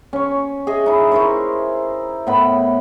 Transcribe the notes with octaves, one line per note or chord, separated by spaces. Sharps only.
C#4 C#6
G#4 D#5 E5
D#4 E4
E4 A#4 C5 C#6
A2 B3 B5